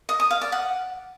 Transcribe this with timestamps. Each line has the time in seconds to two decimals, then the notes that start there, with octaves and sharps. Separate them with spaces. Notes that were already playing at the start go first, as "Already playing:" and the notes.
0.09 D#5
0.20 D#6
0.31 F5
0.41 D5
0.52 F#5